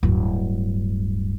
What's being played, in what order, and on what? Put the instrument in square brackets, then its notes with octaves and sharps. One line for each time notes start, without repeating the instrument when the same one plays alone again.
[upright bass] D1 G2